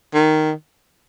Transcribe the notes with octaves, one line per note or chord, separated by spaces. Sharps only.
D#3